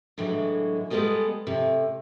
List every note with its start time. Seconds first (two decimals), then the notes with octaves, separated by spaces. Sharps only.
0.18 A2 D3 E3 F#3 G#3
0.90 G3 G#3 B3 G4 A4 D#5
1.47 A2 C3